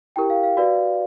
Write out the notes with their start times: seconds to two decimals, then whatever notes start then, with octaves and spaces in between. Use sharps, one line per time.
0.16 E4 G4 A#4 G5
0.30 F5
0.43 F5
0.57 F#4 B4 D5 F5